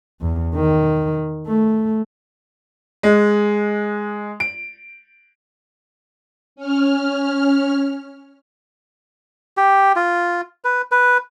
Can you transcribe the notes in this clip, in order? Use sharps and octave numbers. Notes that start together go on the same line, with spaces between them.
E2
D#3
A3
G#3
D7
C#4 F6
G4
F4
B4
B4